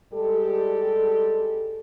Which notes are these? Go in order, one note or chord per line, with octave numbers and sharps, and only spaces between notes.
G3 G#3 G4 A4